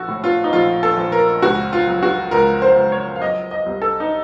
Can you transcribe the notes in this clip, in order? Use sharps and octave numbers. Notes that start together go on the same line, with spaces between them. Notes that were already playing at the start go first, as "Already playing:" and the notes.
Already playing: A#1 F#4 A4
A2
F4
D#4
A#1 F4
A4
A#1
A#4
C#2 F#4
F4
F#3
F#4
C#2 A#4
C5
C#2
C#5
F5
F#3 D#5
D#5
C2
A4
D#4